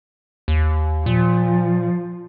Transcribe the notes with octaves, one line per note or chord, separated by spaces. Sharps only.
D#2
A#2 F3